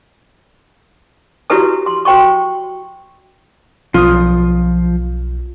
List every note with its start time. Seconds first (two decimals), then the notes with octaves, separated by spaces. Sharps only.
1.50 E4 F#4 G4 B4 A5 D#6
1.86 C6
2.05 F#4 C5 G5 C6 C#6
3.94 B1 F3 F4 D#6